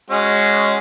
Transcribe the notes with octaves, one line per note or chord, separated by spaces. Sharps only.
G#3 C#4 F#4